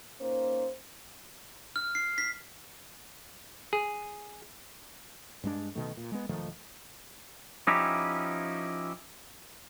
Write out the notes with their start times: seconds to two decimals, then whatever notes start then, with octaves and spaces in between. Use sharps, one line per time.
0.20 A#3 C#4 D#4 C5
1.76 F6
1.95 C7
2.18 B6
3.73 G#4
5.43 G2 G#3 D4
5.75 F#1 B2 D#3 A3
5.97 A#2
6.12 G#3 B3
6.29 E1 D#3 F3 A3
7.67 F3 C#4 D#4 E4 G4